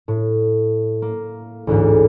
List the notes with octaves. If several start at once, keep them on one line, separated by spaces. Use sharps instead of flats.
A2
A#3
A1 D2 G#2